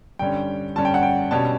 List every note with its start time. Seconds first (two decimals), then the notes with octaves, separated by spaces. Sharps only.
0.19 G2 D3 G3 C#4 G5
0.76 G2 D3 G3 C#4 A5
0.85 G5
0.94 F#5
1.03 G5
1.31 B2 G3 C#4 A5